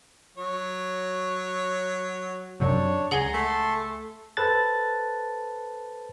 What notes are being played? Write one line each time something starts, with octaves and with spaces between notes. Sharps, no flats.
F#3 C#5
F#2 C3 F#3 D4 C#5
C#2 G#4 F#5 G#5 A#5 C6 G7
A3 A4 C6
A4 B4 C5 A5 F#6 A6